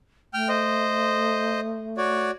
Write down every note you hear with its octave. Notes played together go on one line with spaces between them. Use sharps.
A3 G5 F6
C5 D#5
F#4 C#5 D5